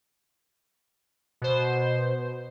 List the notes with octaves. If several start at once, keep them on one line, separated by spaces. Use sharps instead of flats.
B2 C5